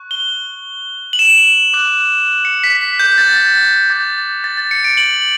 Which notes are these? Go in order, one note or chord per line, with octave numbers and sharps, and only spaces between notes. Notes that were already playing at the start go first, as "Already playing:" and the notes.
Already playing: C#6 F#6
G7
F#7
E7
D6 F#6
C#7
B6
B6
G6
A6
A6
D6 G6 A6
A6
A6
C#7
D7
F#7